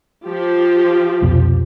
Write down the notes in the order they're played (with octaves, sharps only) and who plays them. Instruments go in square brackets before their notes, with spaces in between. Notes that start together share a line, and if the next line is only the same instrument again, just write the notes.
[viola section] F3 G4
[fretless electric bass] C2 F2 B2